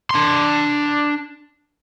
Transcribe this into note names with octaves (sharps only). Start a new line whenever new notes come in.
D4 C6